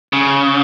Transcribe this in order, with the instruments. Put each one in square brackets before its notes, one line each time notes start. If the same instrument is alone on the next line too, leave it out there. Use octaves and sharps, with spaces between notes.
[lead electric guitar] C#3